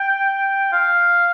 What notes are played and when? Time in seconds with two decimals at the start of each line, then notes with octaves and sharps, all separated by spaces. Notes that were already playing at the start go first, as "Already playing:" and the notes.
Already playing: G5
0.73 F5